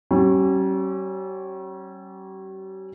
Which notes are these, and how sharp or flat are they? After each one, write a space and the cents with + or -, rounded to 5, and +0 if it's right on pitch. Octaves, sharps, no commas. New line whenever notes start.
G3 -45 C#4 -25